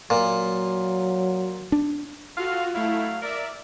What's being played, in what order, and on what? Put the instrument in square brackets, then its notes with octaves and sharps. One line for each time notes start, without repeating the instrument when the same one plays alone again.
[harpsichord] A#2 [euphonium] F#3
[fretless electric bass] D4
[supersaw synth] F4 F#4 [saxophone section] A4 F5
[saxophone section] F#3 F5 [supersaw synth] A3 E4
[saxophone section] A#4 [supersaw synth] D5 E5